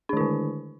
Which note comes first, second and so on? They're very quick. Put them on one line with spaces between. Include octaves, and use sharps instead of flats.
D4 D#3 E4 D3